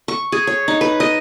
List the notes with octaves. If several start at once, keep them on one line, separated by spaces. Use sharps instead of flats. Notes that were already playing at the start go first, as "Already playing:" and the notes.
C#6
G#4
C#5
D#4
B4
D#5